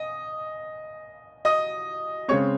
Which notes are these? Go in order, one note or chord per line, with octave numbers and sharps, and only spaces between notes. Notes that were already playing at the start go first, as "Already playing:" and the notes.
Already playing: D#5 D#6
D#5 D#6
C#3 G#3 C4 C#5 C#6